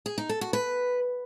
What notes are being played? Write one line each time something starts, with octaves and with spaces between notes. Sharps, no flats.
G#4
D#4
A4
F#4
B4